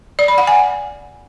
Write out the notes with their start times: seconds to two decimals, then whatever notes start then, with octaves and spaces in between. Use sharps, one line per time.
0.19 D5
0.28 B5
0.38 F#5
0.47 G#5